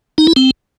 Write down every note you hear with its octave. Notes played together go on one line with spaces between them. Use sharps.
D#4
E4
C4